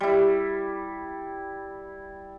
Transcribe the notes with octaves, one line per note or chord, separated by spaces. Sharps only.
G3 E4